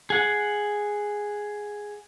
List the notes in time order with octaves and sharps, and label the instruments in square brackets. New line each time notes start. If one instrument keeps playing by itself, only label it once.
[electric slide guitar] G#4 F#5